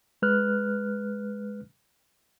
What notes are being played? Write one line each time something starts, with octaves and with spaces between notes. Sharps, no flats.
G#3 B4 F6 F#6